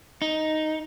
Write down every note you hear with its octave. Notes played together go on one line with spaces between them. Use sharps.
D#4